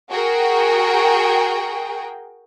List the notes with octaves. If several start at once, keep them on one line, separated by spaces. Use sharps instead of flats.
F#4 G#4 A#4 G5